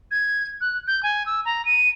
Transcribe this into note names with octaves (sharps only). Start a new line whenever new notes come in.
G#6
F#6
G6
G#5
E6
A#5
D#7